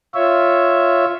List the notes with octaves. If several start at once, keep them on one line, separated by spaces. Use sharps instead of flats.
F4 C#5 E5